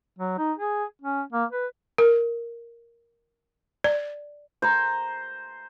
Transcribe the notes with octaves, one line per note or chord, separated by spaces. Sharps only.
F#3
D#4
G#4
C#4
A#3
B4
A#4
D5
C5 A#5